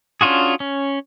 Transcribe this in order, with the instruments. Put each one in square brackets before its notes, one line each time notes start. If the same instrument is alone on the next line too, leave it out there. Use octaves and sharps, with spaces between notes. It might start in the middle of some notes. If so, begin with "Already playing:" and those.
[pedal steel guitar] C#4 D4 F4 F#4 G#4
C#4